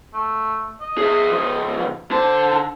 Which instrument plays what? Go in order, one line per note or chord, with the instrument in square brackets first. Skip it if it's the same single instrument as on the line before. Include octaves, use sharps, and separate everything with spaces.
[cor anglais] A3
D#5
[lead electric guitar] G#4 E5
C#2 F3
[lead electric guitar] D3 A5 [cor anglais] C5